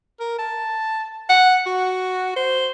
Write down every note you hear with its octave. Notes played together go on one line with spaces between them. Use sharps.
A#4
A5
F#5
F#4
C5